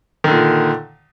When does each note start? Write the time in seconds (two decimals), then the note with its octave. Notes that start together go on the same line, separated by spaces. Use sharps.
0.24 D#3
0.28 D3
0.31 A#2